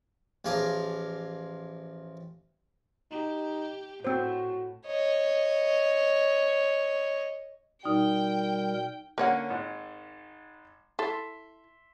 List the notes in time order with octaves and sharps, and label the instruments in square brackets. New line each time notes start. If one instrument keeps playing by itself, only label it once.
[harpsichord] A1 F3 G#4 F5 A#5 D6
[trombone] D#4 [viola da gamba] G4
[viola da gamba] A2 [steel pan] C4 C5 [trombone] F#4
[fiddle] C#5 D#5
[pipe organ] B2 G3 A#4 [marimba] D#4 [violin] G5
[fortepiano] D3 A#3 C#4 [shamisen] A#4 C#5 F#5
[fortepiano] G#1 G#2
[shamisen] E4 A4 [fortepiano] E5 C6